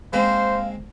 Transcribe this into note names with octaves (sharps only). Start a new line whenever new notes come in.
G#3 A#3 C4 C5 F5